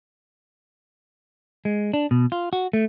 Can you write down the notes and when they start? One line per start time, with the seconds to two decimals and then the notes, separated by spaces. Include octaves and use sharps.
1.65 G#3
1.94 D4
2.11 B2
2.32 F4
2.53 F#4
2.73 A3